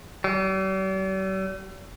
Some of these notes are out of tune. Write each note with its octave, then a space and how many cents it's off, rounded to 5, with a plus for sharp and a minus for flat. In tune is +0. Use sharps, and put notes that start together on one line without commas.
G3 -45